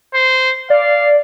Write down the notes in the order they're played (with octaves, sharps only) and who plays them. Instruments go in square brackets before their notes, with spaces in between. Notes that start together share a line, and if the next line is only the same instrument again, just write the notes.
[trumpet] C5
[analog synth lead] D5 [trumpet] F5